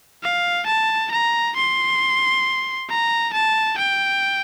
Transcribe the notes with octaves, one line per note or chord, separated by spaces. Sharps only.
F5
A5
A#5
C6
A#5
A5
G5